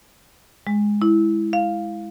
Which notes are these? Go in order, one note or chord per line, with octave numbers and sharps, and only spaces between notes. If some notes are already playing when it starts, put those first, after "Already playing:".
G#3
E4
F5